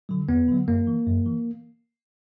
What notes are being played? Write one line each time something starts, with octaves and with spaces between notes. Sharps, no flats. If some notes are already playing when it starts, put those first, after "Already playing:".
D3 F#3
E2 B3
D3 F#3
F#2 A#3
E3
F#2
E3